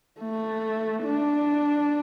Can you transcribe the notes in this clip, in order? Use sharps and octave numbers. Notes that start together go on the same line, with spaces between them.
A3
D4